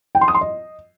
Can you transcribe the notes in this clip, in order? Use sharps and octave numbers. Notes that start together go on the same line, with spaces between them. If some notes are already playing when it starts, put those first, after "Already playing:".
G5
C6
D#6
C6
D#5